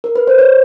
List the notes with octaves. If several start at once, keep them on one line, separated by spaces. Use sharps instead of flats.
A#4
B4
C5
C#5